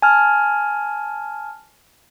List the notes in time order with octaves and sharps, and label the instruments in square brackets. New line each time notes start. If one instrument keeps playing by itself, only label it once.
[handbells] G#5 A5 F6